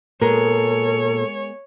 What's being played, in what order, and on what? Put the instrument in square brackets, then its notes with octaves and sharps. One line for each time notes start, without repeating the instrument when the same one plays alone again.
[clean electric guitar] A#2 [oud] G#3 B3 A#4 [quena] A4 [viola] C#5